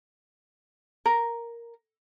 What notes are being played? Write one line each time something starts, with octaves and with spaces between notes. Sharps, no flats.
A#4